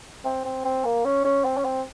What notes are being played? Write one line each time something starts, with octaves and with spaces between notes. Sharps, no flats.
C4
C4
C4
A#3
C#4
C#4
C4
C#4
C4